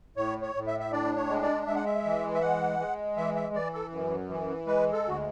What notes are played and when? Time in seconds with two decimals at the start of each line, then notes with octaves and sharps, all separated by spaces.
0.16 A2 C#5
0.42 C#5
0.55 A2
0.67 E5
0.80 E5
0.92 D4 D5
1.17 C#5
1.29 G#3
1.42 D5
1.67 G#3 E5
1.76 F#5
1.85 E5
2.05 E3
2.34 E5
2.42 G#3 F#5
2.79 G#3
3.17 E3 E5
3.36 E5
3.54 E3 D5
3.74 A4
3.92 F#2
4.29 E3
4.67 G#3 B4
4.93 A4
5.05 D2 F#4